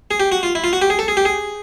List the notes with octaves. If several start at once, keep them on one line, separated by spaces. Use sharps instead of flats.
G#4
G4
F#4
F4
E4
F4
F#4
G4
G#4
A4
G#4
G4
G#4